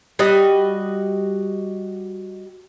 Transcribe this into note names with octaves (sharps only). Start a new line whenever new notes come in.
G3 F#4 D#5